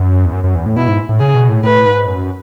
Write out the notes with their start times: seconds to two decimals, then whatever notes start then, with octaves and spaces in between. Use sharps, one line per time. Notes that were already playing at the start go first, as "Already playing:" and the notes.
Already playing: F#2
0.25 E2
0.33 F#2
0.44 F#2
0.55 E2
0.66 A2
0.76 B2 E4
0.88 G#2
1.09 A2
1.20 C#3 G#4
1.34 B2
1.49 A2
1.64 A2 B4
1.86 G#2
2.07 F#2